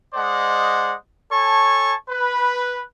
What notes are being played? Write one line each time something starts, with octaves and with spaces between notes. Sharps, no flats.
G#3 C5 D5 D#5 F#5
A4 C#5 G#5 A5 C#6
B4